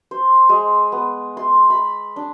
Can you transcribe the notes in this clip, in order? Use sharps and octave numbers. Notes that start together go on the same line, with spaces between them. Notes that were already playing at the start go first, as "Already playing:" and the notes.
C5
G#3
B3
C6
B5
D4